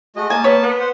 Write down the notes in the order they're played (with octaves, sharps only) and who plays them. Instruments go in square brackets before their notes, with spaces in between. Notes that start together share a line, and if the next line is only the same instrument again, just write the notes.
[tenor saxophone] G#3 [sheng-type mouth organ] A3 F#4 D#5
[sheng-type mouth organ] A#3 A5 [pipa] G#5
[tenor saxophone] B3 [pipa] C#5
[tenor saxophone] B3
[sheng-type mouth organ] C5 F#5